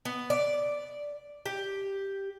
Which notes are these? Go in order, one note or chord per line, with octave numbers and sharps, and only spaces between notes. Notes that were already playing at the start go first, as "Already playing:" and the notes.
B3
D5
G4